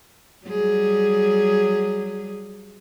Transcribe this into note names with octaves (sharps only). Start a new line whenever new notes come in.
F#3 G3 G#4